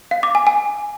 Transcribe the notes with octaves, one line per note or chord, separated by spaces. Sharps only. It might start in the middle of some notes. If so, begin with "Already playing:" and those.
F5
D6
G#5
G#5